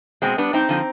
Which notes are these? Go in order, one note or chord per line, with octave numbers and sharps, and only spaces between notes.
B2 G#3 C4
G3 B3 D4
G2 C4 D#4
D3 F3